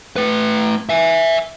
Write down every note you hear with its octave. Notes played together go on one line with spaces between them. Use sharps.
A3 B4
E5 G#5